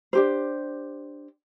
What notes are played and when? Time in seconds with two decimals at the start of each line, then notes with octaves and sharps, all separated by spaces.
0.13 D4 G4 C5